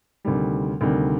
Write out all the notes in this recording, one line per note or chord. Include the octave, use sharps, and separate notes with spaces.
D2 C3 D#3 G3
D2 C3 D#3 G3